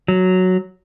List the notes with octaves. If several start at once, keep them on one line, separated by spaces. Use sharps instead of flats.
F#3